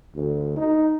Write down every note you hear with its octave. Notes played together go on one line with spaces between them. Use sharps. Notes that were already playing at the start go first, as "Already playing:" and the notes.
D2
D#4